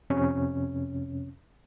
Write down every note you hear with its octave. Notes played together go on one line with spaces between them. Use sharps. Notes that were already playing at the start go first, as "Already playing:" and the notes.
F2 C3 C#4